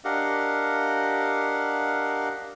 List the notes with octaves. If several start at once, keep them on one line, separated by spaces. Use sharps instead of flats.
D4 G4 A#4 D#5 F5 F#5